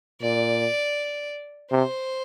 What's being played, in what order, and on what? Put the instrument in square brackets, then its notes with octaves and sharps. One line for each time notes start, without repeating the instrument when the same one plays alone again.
[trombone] A#2 [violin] D5
[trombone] C3 [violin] C5